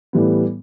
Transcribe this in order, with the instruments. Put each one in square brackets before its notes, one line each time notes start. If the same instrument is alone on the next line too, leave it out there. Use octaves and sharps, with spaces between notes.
[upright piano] A2 E3 G3 B3